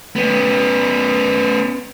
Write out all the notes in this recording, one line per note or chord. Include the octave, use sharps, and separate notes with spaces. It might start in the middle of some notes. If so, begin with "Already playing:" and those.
B3 C#4